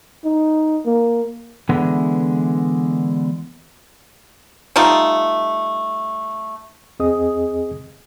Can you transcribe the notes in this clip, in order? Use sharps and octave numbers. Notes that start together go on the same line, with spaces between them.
D#4
A#3
D3 E3 G#3 B3
G3 A3 D#4 F4
E2 C4 G#4 D#5 D#6